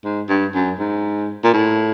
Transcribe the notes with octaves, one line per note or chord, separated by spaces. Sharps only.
G#2
G2
F#2
G#2
A#2
A2